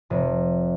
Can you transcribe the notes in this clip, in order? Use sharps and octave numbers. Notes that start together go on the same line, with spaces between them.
F1